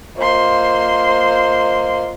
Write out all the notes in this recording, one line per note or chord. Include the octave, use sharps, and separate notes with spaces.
A#3 F4 C5 D#5 C6